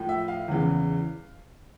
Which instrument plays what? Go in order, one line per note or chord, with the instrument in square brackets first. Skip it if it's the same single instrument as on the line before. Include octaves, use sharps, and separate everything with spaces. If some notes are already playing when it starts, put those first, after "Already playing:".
Already playing: [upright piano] A2 F3
E5
F5
E2 C#3 E3